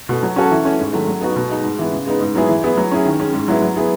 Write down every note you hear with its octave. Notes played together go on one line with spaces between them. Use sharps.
B2 A3
F#3
C#4 F#4 A4
E3
A3 C#4
G#2
D#3 F#3 A3
F#3
B3 D#4 F#4
B2
G#3 D#4
G#2
E3 B3
C#3
G#3 B3 D#4
G#2
F#3 B3 E4 G#4
E3
B3 E4 G#4
F#3
C#4 E4 G#4
D#3
G#3 C#4
G#2
F#3 B3 E4
F#3
B3 E4 G#4